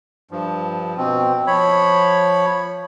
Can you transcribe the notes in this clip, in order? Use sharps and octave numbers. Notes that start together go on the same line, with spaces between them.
G2 F3
B2 C4
F3 C#5 B5